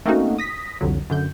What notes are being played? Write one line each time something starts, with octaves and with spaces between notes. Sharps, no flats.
A3 A#3 C4 C#4 D#4 F#4
D#6 A#6 B6
C2 F2 D3 F#3
F#2 D3 G6